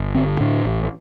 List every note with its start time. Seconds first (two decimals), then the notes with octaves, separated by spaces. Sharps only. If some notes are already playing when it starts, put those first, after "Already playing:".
Already playing: G1
0.15 D3 C4
0.40 A2 D4
0.66 A1